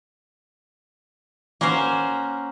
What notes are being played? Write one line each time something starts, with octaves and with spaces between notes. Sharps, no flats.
A#3 C#4 F#4 A#4 C5